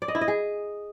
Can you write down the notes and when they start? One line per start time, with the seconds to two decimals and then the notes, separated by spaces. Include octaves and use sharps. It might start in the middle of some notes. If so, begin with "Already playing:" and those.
0.02 D5
0.08 D#5
0.15 E4
0.21 D#5
0.28 G#4